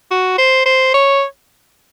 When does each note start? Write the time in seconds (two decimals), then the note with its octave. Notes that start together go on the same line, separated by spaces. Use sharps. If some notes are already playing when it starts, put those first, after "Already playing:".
0.11 F#4
0.38 C5
0.66 C5
0.94 C#5